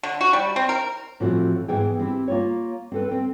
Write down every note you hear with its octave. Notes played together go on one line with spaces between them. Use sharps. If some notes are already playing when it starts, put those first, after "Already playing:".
D3
F#4
G3
C4
A#4
A2 E3 F3 A3 C4 F#4
G#2 E3 B3 E4 G#4 G5
C4 E4 G4
A#3 F4 C#5
C4 A4 B4
C4 G5